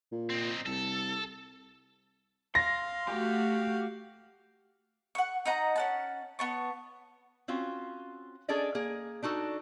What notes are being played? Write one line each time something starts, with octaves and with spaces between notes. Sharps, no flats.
A#2
C4 D#4
C2 A4
F5 C6 A#6
A3 F#4 G4
F#5 C#6
D#4 D#5 F#5 A#5
C#4 F#5 A5
B3 A5 C#6
C4 C#4 F4 F#4
C#4 D4 G#4 A4 D5 D#5
A#3 G#4
D4 D#4 F#4 A4